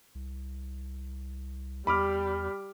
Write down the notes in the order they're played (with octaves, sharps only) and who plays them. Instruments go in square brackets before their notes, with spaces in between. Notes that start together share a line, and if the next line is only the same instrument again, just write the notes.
[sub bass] C2
[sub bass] E2 [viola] G3 [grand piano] B5 D6 F6